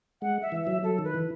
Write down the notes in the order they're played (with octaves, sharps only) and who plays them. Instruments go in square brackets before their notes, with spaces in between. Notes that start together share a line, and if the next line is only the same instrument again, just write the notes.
[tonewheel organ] G#3 [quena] F#5
[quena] E5
[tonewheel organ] E3
[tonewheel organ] F#3 [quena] E5
[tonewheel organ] F#3 [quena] A4
[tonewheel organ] D#3
[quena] B4
[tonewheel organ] E3